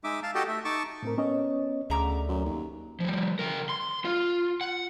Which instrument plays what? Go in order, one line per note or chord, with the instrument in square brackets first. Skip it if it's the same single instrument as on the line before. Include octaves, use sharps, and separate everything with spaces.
[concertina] G#3 D#4 E5 D6
F5 A5
F#4 G4 A4 D#5 G5 A5
A3 E5
D#4 A5 C#6 D6
[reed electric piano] A2 C4 A#4
B3 C#4 C#5 D#5
[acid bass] D2 [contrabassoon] C#3 [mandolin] E5 A#5 D6
[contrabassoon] F#2
D#2
[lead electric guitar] F3 G3
C#3 A#4
C6
F4
F#5